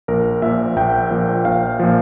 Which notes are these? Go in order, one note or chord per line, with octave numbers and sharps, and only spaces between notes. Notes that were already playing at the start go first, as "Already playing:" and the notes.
A#1 A#4
A#2 F3 E5
A#1 G5
A#2 F3
A#1 F5
A#2 F3